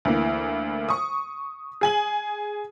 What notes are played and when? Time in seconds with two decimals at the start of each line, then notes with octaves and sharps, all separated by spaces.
0.05 D2 E3 A#3
0.89 C#6 D#6
1.81 G#4 G#5 F#7